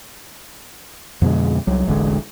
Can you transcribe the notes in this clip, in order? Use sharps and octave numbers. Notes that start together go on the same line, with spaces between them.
F2 B2 D3 G#3
C2 F#3
E1 A1 D3 G#3